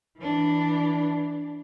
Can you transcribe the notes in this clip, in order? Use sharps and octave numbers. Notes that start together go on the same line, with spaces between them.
E3 D4